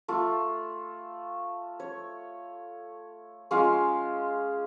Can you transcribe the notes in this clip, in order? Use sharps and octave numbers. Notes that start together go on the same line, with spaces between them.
A3 F4
C#5
G#3 C#4 F4 F5